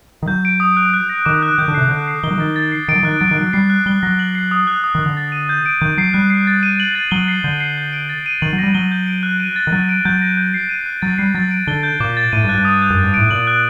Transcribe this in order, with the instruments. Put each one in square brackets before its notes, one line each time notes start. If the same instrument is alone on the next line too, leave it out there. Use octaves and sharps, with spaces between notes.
[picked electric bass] D#3
[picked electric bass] F#3 [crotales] G6
[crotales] D7
D#6
F#6
F#6
A#6
[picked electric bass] D#3 [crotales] D6
[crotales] F#6
[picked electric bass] D#3 [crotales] G6
[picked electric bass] D3
[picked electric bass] C3 [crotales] C7
[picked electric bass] D3 [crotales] F#6
[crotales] C7
[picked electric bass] D#3 [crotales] G7
[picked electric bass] F#3
[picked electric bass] D#3 [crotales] A6
[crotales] A6
C7
[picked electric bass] D#3 [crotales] D7
[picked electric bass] F#3
[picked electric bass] D#3 [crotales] F#6
[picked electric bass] F#3 [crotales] A6
[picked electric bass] D#3
[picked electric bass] F#3 [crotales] D7
[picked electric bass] G3 [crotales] C7
[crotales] F#6
[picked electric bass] G3 [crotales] G7
[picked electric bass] F#3 [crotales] A#6
[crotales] F#7
C7
D#6
F#6
D#6
[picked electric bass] D#3
[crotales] F#6
[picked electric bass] D3
[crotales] A6
D#7
G6
D7
[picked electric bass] D#3 [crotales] G6
[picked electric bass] F#3 [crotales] C7
[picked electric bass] G3 [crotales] F#6
[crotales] C7
A6
D#7
F#7
A6
[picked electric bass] F#3 [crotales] G7
[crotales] C7
[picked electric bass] D3 [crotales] G6
[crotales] C7
G6
D7
A6
D#7
[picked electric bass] D#3 [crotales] F#7
[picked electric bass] F#3
[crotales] A#6
[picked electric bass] G3
[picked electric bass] F#3 [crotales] G7
[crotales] G6
D7
F#6
D#7
A6
[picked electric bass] D#3
[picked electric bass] F#3 [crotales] A6
[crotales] D7
[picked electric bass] F#3 [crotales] G6
[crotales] A#6
G6
C7
D#7
F#6
[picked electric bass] F#3 [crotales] A6
[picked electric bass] G3 [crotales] C7
[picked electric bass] F#3 [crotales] A6
[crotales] D7
[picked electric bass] D3 [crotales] G7
[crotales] G6
[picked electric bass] A#2 [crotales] D6
[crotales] A6
[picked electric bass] A2 [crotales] D#7
[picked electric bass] G2
[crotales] F#6
[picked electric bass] G2
[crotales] D#6
G6
[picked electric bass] F#2
[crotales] G6
[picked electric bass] G2
[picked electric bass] A2 [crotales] D7
[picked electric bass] A#2 [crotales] F#7
[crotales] F#6